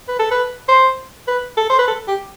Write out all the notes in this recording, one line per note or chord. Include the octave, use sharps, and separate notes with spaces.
B4
A4
B4
C5
B4
A4
C5
B4
A4
G4